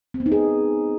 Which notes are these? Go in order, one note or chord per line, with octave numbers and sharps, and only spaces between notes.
C4
B3
D#4
G#4